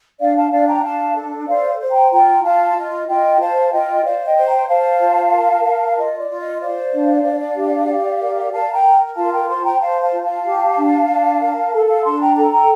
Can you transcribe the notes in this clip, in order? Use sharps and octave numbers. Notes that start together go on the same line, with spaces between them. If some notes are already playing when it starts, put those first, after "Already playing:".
D4 D5 F5
F5 A5
D4 D5 F5
G5 A#5
D4 F5 A5
A4
C5 D5 F5
C5
G5 A#5
F4 G5 A#5
F4 F5 A5
F4 D#5
F4 D#5 G5
C5 F5 A5
F4 D#5 G5
C5 D5 F5
D#5 G5
C5
G5 A#5
C5 F5 A5
F4
A#4
A#4
F5
F4 D#5
D5
F4
D#5
C5 D5 F5
D4
D4
G4
G4
A#4
A#4 F5 A5
G5 A#5
A#4
F4 F5 A5
G5 A#5
C5 A5 C6
G5 A#5
C5 F5 A5
F5 A5
F4
F5 A5
G4
D4
D4
A#4
A4
F5 A5
D4 A5 C6
G5 A#5
A4 G5 A#5
G5 A#5